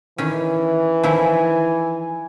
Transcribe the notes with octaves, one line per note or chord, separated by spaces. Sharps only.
D#3 E3 C#4
D#3 F3 E4 G#5